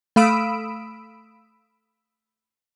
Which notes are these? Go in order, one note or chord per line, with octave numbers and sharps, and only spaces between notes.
A3 F5 B5 D#6 E6 D7